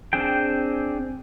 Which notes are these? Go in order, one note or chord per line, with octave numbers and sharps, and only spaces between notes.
C4 D4 G#4 G5